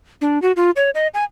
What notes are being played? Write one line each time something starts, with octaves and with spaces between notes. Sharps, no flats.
D4
F#4
F4
C#5
D#5
G#5